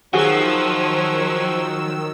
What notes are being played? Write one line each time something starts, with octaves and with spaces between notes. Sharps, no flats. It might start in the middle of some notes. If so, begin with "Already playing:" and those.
D#3 F3 F#3 F#4 G#4 E6